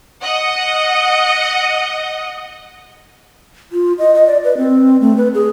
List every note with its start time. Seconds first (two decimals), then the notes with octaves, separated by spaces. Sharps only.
0.22 D#5 F#5
3.72 F4
3.99 D#5
4.15 D#5
4.27 D5
4.44 B4
4.58 C4
5.01 A3
5.17 B4
5.34 G#4